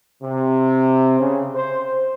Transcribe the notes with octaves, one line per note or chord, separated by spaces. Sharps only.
C3
C#3
C5